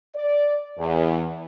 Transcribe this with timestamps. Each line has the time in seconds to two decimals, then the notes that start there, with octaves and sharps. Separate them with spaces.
0.16 D5
0.79 E2